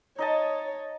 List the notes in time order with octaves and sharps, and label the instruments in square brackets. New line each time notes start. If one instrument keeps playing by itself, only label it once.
[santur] D#4 D#5 A5 [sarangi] C#5